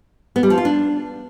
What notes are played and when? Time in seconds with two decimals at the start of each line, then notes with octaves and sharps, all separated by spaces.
0.36 B3
0.43 G3
0.50 F3
0.58 F4
0.65 D4